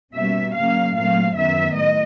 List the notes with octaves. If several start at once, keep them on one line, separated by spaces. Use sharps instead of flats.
B2 G3 A#3 C#4 E5
C#3 F#3 A#3 F5
A#2 F#3 A3 C4 F5
F#2 D#3 F#3 B3 E5
A2 D#5